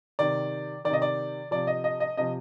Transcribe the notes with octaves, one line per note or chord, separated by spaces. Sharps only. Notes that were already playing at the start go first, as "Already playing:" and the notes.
C3 D#3 D5
D#3 D5
C3 D#5
D5
C3 F3 D5
D#5
D#5
D#5
C3 F3 D#5